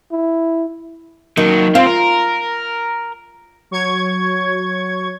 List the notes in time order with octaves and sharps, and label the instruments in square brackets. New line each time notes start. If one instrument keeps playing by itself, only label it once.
[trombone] E4
[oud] D#3 [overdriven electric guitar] F#3 A#3
[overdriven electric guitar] C4 [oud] F4
[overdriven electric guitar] A#4
[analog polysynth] F#3 C#5 C#6 G#6